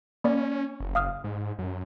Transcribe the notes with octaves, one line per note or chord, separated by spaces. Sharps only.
A#3 C#4 D5
F#1
F5 D#6 F6
G#2
F#2